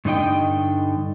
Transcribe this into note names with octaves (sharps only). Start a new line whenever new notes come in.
G2 D3 D#4 D#5 G5